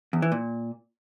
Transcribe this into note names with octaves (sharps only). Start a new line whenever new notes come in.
E2
E3
A#2